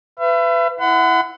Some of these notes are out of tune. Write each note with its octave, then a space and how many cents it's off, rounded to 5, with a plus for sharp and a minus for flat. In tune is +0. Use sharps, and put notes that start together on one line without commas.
B4 +25 E5 +40
E4 +0 F#5 +0 B5 +45